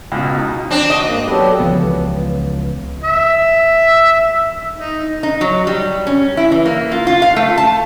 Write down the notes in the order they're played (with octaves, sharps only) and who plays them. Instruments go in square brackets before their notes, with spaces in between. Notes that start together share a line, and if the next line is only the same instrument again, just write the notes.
[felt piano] C#2 B2
D#4
[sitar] C4 D4
[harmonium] F#4 [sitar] D#5
[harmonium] G#2 A#3
[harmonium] F#3 G4 A4 [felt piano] B3 D4
[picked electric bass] C#2 E3 F3 B3
[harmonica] E5
D#4
[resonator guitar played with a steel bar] D#4
F#3
G3
C#4
E4
E3
A#3
F4
F4
F5
A3
A5